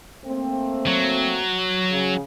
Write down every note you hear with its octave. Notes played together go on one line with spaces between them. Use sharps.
A3 A#3 C4
F#3
C#3